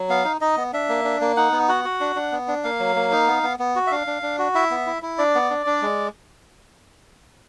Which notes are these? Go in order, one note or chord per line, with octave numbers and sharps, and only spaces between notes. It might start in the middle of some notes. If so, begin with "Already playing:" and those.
Already playing: F#3
B3 F5
D#4
D#4 D#5
B3
D4 E5
A#3
D4
A#3
D#4 F#5
B3
F#4 F#5
F#4
D4
D4
B3
D4
A#3 F5
F#3
A#3
D#4
B3
B3
B3
F#4
E5
D4 F5
D4
D4
F#4
E4 E5
B3
E4
E4
D4 D5
B3
D4
D4
G#3